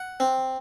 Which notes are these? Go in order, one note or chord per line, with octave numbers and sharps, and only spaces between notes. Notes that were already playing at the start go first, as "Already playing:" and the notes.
Already playing: F#5
C4